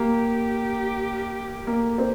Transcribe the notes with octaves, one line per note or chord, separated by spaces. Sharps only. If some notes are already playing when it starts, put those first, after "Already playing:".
Already playing: A#3 G4
A#3
C4